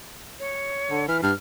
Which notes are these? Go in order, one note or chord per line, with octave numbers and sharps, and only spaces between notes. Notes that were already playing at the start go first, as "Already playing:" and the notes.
C#5
D3
E3 F6
G2 F6